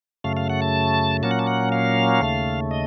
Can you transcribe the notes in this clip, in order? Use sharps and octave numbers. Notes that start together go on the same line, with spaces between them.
F#2 C#3 A3 F5
F5
F#5
A5
A#2 F#3 A#3 C#4 A5
F#5
A5
F#5
F5
D#2 C#3 A3
D#5